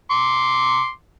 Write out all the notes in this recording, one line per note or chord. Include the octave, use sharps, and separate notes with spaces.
C6 D6